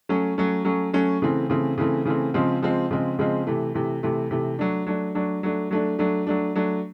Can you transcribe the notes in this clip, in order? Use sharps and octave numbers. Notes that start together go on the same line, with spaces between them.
F#3 A3 C#4
F#3 A3 C#4
F#3 A3 C#4
F#3 A3 C#4
C#3 E3 A3 C4
C#3 E3 A3 C4
C#3 E3 A3 C4
C#3 E3 A3 C4
C#3 F3 G#3 C4
C#3 F3 G#3 C4
C#3 F3 G#3 C4
C#3 F3 G#3 C4
C3 E3 A3
C3 E3 A3
C3 E3 A3
C3 E3 A3
F#3 A3 D4
F#3 A3 D4
F#3 A3 D4
F#3 A3 D4
F#3 A3 D4
F#3 A3 D4
F#3 A3 D4
F#3 A3 D4